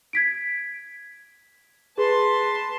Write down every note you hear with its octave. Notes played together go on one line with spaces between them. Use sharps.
G#6 B6 D7
G#4 B4 A5 C6